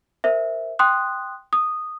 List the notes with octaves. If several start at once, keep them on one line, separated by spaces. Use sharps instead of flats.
A#4 C5 E5
G5 C6 D#6 F#6
D#6